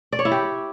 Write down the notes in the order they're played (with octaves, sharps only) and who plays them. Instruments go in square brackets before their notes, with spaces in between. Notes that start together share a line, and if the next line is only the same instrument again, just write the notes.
[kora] D5
C#5
E4
G4